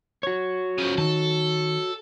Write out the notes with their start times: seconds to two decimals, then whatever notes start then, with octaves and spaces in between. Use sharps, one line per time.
0.23 F#4 C#5
0.78 C#3 F3
0.98 D#3 A4